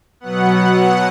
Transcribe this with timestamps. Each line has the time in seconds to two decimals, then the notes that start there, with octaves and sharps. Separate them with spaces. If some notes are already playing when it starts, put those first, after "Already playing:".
0.20 B2 F#3 B3 F#5
0.75 F#5